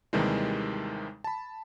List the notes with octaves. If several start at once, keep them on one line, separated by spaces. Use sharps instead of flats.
D#2 C3 D#3 E3 G3 G#3
A5 B5